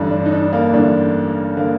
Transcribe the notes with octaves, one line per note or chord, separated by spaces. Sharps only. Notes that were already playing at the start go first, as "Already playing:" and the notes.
Already playing: A1 G2 D3 D4
D4
D#4
D4
A#3
A1 G2 D3 D4
D3 A#3